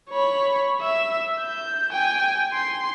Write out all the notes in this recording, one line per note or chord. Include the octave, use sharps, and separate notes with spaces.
C#5 B5
E5
G6
G5 G#5
C6